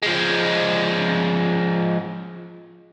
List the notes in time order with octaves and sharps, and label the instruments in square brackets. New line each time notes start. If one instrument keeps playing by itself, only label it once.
[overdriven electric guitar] F3 G#3